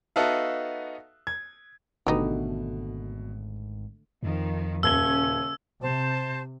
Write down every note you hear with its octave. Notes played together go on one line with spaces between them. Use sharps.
B3 D#4 F#4 A4 E5 F5
G#6
G#1 B2 D3 A3 B3 D#4 G4
F2 D#3 F3
D#1 C#3 C#4 E6 G#6 G7
C3 C5 A5